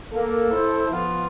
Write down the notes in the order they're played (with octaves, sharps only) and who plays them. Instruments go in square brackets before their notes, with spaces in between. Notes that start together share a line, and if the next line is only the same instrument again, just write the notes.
[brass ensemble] A#3 [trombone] A4
[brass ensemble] E4 C5
F3 B3 F4